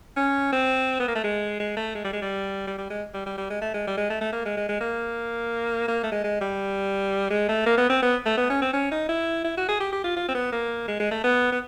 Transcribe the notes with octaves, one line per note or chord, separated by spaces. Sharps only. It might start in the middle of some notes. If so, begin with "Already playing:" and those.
C#4
C4
B3
A#3
A3
G#3
G#3
A3
G#3
G3
G#3
G3
G3
G3
G#3
G3
G3
G3
G#3
A3
G#3
G3
G#3
A3
A3
A#3
G#3
G#3
G#3
A#3
A#3
A3
G#3
G#3
G3
G#3
A3
A#3
B3
C4
B3
A3
B3
C#4
C4
C#4
D#4
E4
E4
F#4
G#4
G4
G4
F4
F4
C4
B3
A#3
G#3
G#3
A3
B3
B3